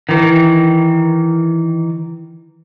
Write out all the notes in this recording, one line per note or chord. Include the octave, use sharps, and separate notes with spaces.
D#3 E3